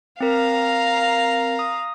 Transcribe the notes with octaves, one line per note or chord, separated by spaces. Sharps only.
C4 A#4 F5 A#5
D#6